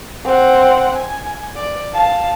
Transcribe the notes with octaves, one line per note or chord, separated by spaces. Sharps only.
C4 F#5
G#5
D5
F5 A5